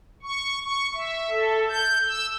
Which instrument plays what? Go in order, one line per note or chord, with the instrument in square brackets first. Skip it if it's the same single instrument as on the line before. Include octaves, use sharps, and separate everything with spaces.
[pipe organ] C#6
C#6
E5
A4
G6
E6